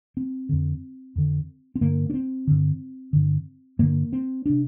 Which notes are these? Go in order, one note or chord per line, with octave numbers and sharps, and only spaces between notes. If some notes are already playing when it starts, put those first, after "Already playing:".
C4
F2 D3
F2 D3
C4
G2 D3 A#3
D4
C4
G2 D3
G2 D3
G2 D3 A#3
C4
C3 D4